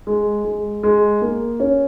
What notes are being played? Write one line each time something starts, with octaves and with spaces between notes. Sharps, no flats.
G#3
G#3
G#3
A#3
C#4